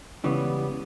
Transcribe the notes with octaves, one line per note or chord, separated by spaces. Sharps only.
C#2 C#3 E3 G3 B3